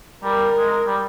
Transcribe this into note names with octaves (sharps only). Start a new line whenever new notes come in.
G3 A#4
G#3
G3